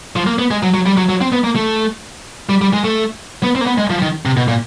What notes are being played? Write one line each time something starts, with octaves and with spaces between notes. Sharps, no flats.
F3
A#3
B3
G#3
F#3
F#3
G3
F#3
F#3
C4
B3
A#3
A3
G3
G3
G#3
A3
B3
C4
A#3
B3
G#3
F3
D#3
C3
B2
A#2